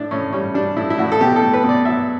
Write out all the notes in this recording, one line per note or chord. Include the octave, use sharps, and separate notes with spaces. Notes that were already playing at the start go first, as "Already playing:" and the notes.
Already playing: A2 D4
A2 C#4
G3 C#4
G3 D4
A2 E4
E4
A2 F#4
A4
B2 G4
A4
A3
B4
B2
D5
F#3 E5